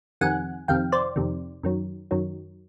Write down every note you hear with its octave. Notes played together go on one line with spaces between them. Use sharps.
F2 C3 D#3 F#5 G#5
F2 C3 D#3 F5 G5
C5 D5
F2 C3 D#3
F#2 D#3 F#3
F#2 D#3 F#3